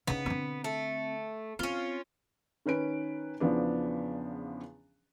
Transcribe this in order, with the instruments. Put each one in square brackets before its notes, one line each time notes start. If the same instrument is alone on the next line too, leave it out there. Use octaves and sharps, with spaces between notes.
[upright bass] C#3 D#4 [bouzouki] B3
[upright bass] D3 C4
[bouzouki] A3
[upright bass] C4 [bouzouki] C#4 F4
[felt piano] D#3 C#4 B4 D7
E2 C#3 F3 B3 D4